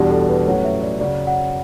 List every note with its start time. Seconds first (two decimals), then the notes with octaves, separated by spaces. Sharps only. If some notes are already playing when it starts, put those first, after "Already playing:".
Already playing: E2 B2 G3 D4 G4
0.10 A4
0.29 B4
0.47 A2 F#3 C#4 F#4 C#5
0.65 E5
0.82 D5
1.00 F#2 C#3 F#3 D5
1.27 F#5